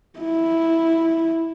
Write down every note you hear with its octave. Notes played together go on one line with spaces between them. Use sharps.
E4